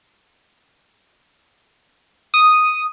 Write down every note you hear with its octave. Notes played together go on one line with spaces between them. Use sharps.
D#6